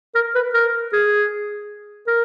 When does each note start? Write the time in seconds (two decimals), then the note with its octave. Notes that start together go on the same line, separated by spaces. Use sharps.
0.15 A#4
0.35 B4
0.54 A#4
0.93 G#4
2.07 A#4